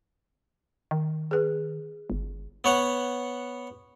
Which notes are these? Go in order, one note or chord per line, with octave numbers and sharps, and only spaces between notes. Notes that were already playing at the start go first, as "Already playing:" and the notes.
D#3
G#4 B4
G1
B3 C#5 F#5